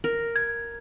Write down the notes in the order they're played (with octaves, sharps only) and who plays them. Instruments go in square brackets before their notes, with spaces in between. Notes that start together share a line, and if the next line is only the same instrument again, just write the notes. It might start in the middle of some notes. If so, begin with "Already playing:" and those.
[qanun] A#4
[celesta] G#6